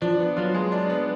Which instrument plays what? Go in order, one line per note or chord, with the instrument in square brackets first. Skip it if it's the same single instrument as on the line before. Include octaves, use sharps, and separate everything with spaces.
[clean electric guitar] F3 [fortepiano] D4
[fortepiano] B3
[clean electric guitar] F#3 [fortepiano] F4
[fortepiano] G#3
D4
B3